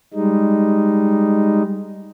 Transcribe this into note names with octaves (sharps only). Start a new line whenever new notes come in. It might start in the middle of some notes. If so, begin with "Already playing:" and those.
G3 G#3 D#4